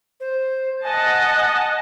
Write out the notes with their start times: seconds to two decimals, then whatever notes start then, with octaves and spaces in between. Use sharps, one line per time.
0.20 C5
0.84 D#5 F#5 G#5 A5